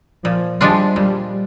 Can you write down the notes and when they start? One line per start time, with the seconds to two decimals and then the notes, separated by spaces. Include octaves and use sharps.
0.24 A#2 F3
0.60 F3 G3 G#3 D4 F4
0.96 A#2 G3